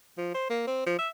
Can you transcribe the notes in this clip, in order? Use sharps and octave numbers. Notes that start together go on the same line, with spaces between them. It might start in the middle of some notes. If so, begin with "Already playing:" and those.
F3
C5
A#3
C4
F3
E5